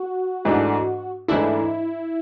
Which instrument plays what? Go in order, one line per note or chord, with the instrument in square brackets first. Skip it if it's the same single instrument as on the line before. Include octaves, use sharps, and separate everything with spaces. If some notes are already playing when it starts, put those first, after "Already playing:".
Already playing: [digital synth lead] F#4
[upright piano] G#2 E3 A3 D4 A4
[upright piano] G#2 E3 A3 D4 A4 [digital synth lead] E4